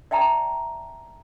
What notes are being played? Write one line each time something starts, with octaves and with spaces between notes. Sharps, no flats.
D5 E5 G5 A5 A#5